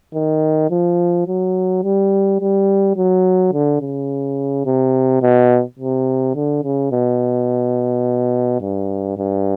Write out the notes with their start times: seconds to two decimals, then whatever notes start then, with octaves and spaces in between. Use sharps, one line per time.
0.15 D#3
0.71 F3
1.27 F#3
1.84 G3
2.41 G3
2.96 F#3
3.53 D3
3.81 C#3
4.66 C3
5.22 B2
5.79 C3
6.36 D3
6.64 C#3
6.92 B2
8.61 G2
9.17 G2